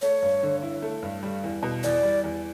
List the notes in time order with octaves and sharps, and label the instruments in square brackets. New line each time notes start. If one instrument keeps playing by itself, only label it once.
[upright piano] A3 [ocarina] C#5
[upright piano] G2
D3
E4
A3
G2
G3
E2
B2
[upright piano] E2 [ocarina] D5
[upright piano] G3
E2